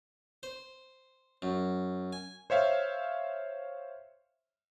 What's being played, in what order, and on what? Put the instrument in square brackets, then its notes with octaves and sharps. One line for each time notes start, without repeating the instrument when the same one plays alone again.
[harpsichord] C5
F#2
G#5
[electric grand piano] C5 C#5 E5 F5